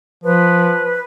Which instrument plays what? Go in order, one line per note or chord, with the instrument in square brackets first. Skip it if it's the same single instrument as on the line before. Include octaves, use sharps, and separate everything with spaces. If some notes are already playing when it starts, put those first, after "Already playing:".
[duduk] F3 [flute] B4